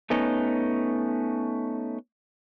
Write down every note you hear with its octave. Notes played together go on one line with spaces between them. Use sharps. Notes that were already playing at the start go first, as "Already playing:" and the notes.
A3 B3 C#4 D#4